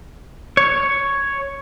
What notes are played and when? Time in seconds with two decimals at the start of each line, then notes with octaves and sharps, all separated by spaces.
0.57 C#5